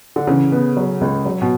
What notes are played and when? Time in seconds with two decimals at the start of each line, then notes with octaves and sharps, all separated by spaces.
0.16 D3
0.27 C#3 E3
0.52 B3
0.77 F#3
1.01 C#2
1.25 F#3
1.42 B2